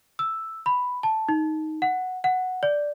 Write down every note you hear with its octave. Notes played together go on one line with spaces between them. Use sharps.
E6
B5
A5
D#4
F#5
F#5
D5